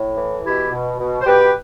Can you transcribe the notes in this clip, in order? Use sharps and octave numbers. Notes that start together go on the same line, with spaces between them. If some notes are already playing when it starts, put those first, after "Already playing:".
Already playing: A2
E3
B2 E4 G4
B2
B2
C5
B2 G4 B4